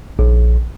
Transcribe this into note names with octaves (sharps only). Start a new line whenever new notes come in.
A#1